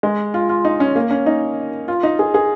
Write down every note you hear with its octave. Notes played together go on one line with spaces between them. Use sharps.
G#3
F4
F4
D#4
C#4
A#3
C#4
D#4
F4
D#4
G#4
G#4